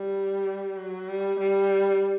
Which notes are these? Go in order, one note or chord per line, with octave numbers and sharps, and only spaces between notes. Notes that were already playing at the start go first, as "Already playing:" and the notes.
Already playing: G3
F#3
G3
G3